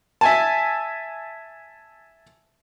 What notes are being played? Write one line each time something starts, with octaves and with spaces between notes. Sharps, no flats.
E5 G#5 A5